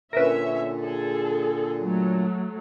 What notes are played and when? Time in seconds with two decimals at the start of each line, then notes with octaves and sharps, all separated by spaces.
0.13 A#2 D3 C#4 A#4 B4 E5
0.80 G#4 A4
1.80 F#3 A3